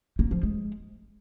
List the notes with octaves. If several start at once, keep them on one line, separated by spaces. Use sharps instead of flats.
A#3
F3
G#3